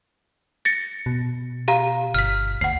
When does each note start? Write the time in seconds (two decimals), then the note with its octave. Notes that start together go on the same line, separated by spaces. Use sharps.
0.65 A6 A#6 C#7
1.06 B2
1.68 G4 F5 A#5
2.14 G1 F6 B6
2.61 D2 F#5 C7